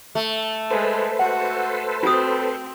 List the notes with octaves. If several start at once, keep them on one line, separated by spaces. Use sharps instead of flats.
A3
G#3 A4 B4 C5
F#4 F#5
C4 F4 F#4 D#6